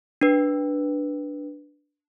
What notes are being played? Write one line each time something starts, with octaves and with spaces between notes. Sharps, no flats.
D4 B4